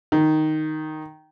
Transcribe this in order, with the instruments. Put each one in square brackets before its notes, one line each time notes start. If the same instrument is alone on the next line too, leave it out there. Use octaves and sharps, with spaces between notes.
[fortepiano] D#3